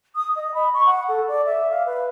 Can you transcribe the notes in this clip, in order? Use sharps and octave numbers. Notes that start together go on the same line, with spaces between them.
D#6
D#5
B5
C#6
F#5
A4
D5
E5
F5
B4